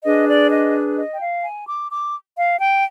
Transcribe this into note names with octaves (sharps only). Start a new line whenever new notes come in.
D4 G#4 B4 D#5
D5
D#5
D#5
G5
F5
G#5
D6
D6
F5
G5